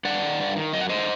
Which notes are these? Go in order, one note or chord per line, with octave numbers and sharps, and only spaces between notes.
G2 D5 F#5
D#3
G2
D#3
F#2 D#5
F#5
D3 C5 D#5